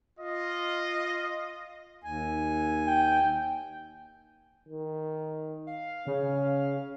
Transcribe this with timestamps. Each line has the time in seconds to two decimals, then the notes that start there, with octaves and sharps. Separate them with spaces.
0.19 F4 D#5
2.04 D#2 G#5
2.88 G5
4.69 D#3
5.67 F5
6.07 C#3 C#4